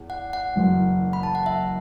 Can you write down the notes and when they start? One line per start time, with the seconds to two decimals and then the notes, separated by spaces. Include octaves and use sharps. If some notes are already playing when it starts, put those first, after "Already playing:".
Already playing: E2
0.10 F#5
0.33 F#5
0.56 F#1 F#2 E3
1.13 B5
1.23 A5
1.35 F#5
1.46 E5